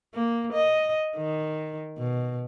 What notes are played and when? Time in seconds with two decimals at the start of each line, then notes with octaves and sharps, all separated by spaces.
0.14 A#3
0.53 D#5
1.16 D#3
1.98 B2